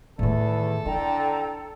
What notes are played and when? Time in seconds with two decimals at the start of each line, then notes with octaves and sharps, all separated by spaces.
0.19 E2 A2 D#3 A4
0.86 D3 E4 G5 A#5